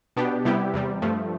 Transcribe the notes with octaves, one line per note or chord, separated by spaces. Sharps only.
B2 B3 D4 G4
C3 G3 B3 E4 G4
E2 C3 G3
G2 F3 A3